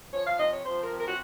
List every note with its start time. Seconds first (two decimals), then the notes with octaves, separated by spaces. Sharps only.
0.12 F3 C#5
0.26 F5
0.38 C3 D#5
0.51 C#5
0.64 F3 C5
0.81 A#4
0.89 C3
0.98 A#4
1.08 F#4